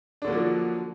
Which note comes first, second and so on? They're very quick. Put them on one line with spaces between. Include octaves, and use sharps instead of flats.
D4 D3 A#3 F#3 F3